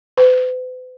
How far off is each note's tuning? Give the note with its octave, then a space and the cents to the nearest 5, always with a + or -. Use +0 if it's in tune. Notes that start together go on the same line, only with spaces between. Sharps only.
B4 +45